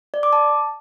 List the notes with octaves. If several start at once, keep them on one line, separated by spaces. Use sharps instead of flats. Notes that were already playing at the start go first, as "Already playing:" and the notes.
D5
D6
A5